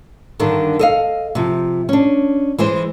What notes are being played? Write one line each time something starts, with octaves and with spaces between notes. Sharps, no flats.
G2 D3 D#3 D4
A4 D#5 F5
C3 F3
C#4 D4
E3 G#3 G#4 C5